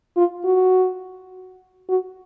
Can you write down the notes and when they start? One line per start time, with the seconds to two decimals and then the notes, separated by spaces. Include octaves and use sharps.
0.17 F4
0.45 F#4
1.89 F#4